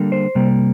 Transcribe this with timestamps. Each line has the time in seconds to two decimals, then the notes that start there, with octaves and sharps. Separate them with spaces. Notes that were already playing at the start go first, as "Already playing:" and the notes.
Already playing: D3 G3 A#3
0.12 C5
0.35 C3 G3 A#3